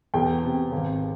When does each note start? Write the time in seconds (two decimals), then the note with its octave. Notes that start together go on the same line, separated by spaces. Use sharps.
0.14 E2 G5
0.43 C3
0.72 G#1